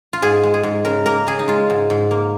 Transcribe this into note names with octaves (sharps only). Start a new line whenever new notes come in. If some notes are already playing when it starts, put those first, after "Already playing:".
F4
G#2 G#4
G#3
G#4
G#2
C#3 A#4
A#3 A#4
C#3 G#4
D#4
G#3 F4
G#2
G#2
A#3